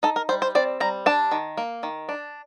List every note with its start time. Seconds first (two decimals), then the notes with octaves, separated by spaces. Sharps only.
0.03 D#4 A4
0.16 A#4
0.29 G3 C5
0.42 C5
0.55 C4 D5
0.80 G3 A#5
1.06 D4 A5
1.31 D#3
1.57 A#3
1.83 D#3
2.09 D4